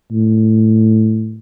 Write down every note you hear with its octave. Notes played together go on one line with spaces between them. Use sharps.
A2